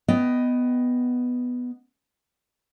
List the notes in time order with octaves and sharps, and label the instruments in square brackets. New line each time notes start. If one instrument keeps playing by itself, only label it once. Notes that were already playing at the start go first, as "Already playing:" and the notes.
[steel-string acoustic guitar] B3 D#5 G5